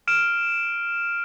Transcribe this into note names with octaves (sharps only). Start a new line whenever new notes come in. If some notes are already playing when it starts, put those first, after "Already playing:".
F6 D7 E7